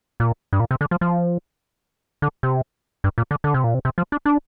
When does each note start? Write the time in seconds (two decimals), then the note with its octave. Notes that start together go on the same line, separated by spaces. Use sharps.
0.20 A#2
0.53 G2
0.60 A#2
0.71 C3
0.81 D3
0.91 F3
1.01 F3
2.22 D3
2.43 C3
3.04 G2
3.18 A#2
3.31 D3
3.44 D3
3.54 C3
3.64 A#2
3.74 C3
3.85 C3
3.98 F3
4.12 D4
4.25 D4